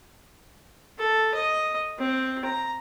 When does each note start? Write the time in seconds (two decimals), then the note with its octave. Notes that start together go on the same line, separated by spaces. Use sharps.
0.98 A4
1.34 D#5
1.98 C4
2.44 A#5